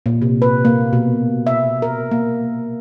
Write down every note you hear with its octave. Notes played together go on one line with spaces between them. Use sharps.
A#2
C3
B4
A#3
B2
E5
A#4
A#3